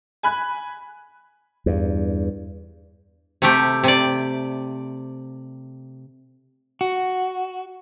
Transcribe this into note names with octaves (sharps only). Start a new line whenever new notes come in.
G#5 B5 F#6
E2 G2
C3 A3 G4
C3 D5
F#4